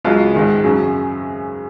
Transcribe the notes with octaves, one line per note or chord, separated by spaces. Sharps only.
C#2 C#3 F#3 F4
G#2 D#3 G#3
F#2 C#3 F#3